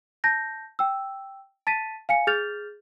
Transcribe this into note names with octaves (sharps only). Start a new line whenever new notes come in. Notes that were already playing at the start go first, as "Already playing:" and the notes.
A5 G6 A#6
G5 E6
A5 A6 B6 D#7
F5 G#5 C#7
G#4 F6 G6 A6 F7